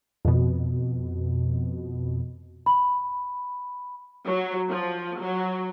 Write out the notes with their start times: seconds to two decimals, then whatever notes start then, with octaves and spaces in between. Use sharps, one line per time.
0.25 F2 B2
2.66 B5
4.25 F#3
4.69 F3
5.20 F#3